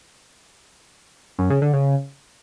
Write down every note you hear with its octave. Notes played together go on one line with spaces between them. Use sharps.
F#2
C#3
D3
C#3